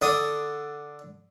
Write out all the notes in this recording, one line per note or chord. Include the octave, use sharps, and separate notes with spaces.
D3 D4 D#6